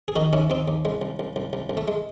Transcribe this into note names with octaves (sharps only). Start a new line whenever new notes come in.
G#4
D#3 D#4 F#4
D#2 C#4 E4
D#2 C4 D#4
D#2
C2 G#3
C2
C2
C2
C2
C2
A3
G#3